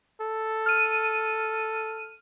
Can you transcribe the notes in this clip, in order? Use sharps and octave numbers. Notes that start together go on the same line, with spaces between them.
A4
F6 D#7